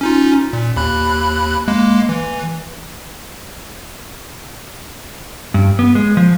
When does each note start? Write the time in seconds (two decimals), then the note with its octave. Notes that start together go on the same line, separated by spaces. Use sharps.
0.01 C#4 D#4 F4
0.53 A#2
0.76 D#2 B5 F#6
1.68 G#3 A#3
2.09 E3
5.54 G2
5.79 B3
5.95 G#3
6.17 F3